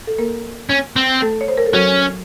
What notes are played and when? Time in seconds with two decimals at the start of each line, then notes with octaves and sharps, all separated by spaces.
0.07 A4
0.18 A#3 A#4
0.70 C#4
0.96 C4
1.22 A3 A4
1.41 C#5
1.48 C5
1.58 A#4
1.66 A4
1.73 F#3 C#4 F#4